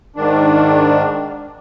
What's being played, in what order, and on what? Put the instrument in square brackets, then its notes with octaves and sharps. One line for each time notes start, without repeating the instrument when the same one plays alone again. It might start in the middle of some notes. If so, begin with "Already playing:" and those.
[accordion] G#2 D#3 D4